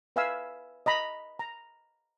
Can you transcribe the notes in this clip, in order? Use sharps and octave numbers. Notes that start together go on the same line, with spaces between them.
B4 E5 F5 G#5 B5 E6
D#5 A#5 B5
A#5